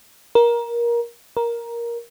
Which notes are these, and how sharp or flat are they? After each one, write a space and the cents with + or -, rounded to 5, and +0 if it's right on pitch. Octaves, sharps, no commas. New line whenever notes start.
A#4 +20
A#4 +10